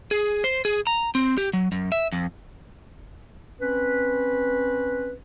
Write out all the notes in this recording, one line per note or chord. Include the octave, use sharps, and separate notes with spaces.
G#4
C5
G#4
A#5
C4
G4
F#3
F#2
E5
F2
C4 C#4 B4